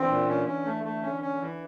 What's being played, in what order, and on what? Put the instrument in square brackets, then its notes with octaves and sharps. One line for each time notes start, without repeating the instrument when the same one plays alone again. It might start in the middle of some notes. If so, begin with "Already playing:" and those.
Already playing: [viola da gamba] D3 E3 [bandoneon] C4
[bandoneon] A#2
C#4
C#4
A3
A3
[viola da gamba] D3 [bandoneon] C#4
[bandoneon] C#4
E3